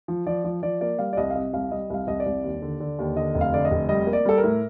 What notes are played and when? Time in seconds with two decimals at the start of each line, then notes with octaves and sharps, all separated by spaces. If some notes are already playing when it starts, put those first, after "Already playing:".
0.08 F3
0.26 F3 D5
0.44 F3
0.62 F3 D5
0.81 A#3 D5
0.99 G3 F5
1.13 D5
1.17 C2 D#5
1.30 F5
1.35 C3 D#5
1.53 C2 F5
1.71 G3 D#5
1.90 C2 F5
2.07 C2 D#5
2.20 D5
2.26 C2
2.43 D#2
2.62 D3
2.80 D3
2.99 D#2
3.16 D3 D#5
3.35 F1
3.41 F5
3.53 D3 D5
3.65 D#5
3.71 F1
3.89 G3 D#5
4.07 A#3
4.13 D5
4.25 G3 A4
4.38 A#4
4.44 A2